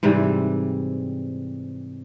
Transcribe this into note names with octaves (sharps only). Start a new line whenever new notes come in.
G#2 C3 E3 G3